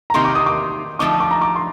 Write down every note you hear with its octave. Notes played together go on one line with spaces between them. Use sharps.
A#5
C3 D#3 A#3 D#4 G4 C6
D6
D#6
D6
D3 F3 A3 C4 D#4 D6
D6
A#5
D6
C6